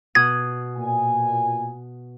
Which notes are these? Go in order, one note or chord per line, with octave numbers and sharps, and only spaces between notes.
B2 F#5 D#6 G#6
A#2 G#5